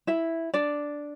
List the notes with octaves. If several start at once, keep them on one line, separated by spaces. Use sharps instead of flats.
E4 E5
D4 D5